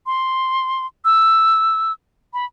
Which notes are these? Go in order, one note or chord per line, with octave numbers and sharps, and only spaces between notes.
C6
E6
B5